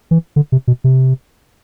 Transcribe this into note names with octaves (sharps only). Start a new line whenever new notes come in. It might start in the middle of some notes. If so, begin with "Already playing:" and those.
E3
D3
C3
B2
C3